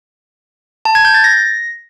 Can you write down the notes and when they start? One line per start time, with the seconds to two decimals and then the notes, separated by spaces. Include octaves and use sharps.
0.85 A5
0.95 G#6
1.05 G6
1.14 A6
1.24 A#6